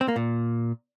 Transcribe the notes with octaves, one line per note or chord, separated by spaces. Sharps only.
C4
A#3
A#2